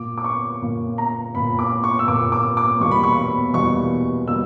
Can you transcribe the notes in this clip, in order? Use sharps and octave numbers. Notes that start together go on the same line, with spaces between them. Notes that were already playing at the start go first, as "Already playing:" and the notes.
Already playing: A#2 A#3 D6
D6
C#6
A#2 A#3
A#5
A#2 A#3 B5
D6
C#6
E6
A#2 A#3 D6
D6
D6
E2 B2 G3 A#3 C#6
B5
C#6
B5
E2 B2 G3 A#3 C#6
B2 G3 A#3 E6